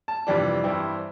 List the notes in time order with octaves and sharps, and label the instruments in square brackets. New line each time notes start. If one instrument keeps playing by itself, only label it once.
[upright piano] A5
F1 F2 E3 G3 D4
G2 E3 G3 C4 E4